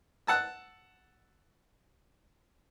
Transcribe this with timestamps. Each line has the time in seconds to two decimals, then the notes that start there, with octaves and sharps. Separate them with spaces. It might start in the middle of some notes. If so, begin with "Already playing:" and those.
0.27 F#5 A5 E6